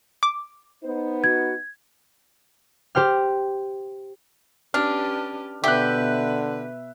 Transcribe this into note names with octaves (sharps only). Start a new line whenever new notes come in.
D6
B3 D#4 C5
F#4 G#6
G4 C5 G5 F6
C#4 D4 G4 B4 F6
B2 D3 G4 B4 E5 F#6